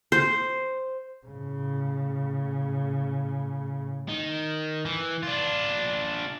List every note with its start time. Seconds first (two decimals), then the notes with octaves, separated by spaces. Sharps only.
0.12 C5
1.27 A2 C#3
4.09 D#3
4.85 E3
5.23 D4 F4